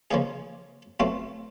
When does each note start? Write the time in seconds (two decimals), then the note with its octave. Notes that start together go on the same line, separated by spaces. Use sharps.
0.11 C#3 F3 A#3 D#4 G#4
1.00 B2 F#3 A3 C4 F4